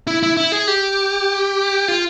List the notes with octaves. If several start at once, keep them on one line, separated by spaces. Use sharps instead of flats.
E4
E4
E4
G#4
G4
F4